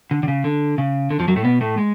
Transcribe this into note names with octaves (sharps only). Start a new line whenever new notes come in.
D3
D3
C#3
D3
C#3
D3
F2 F3
F#2 F#3
A2 A3
B2 B3
A2 A3
G#3